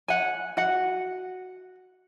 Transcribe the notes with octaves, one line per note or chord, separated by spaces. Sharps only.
F#5 G#5
F#4 F#5